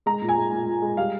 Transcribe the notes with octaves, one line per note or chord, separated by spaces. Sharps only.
G#3 A#5
A#2
G#5
G#3
A#2
A#2
G#3
G3 F5